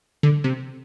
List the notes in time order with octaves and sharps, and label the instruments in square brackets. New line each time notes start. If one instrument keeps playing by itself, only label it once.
[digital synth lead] D3
C3